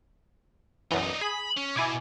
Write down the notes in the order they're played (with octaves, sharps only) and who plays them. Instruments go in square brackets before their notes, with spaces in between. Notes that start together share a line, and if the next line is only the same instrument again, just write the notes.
[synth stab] B1 F#2 E3 [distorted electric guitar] D4 D#4
[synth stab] G#4 [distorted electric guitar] B5
[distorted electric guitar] C#4
[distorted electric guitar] B2 [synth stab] E4 G#5 D6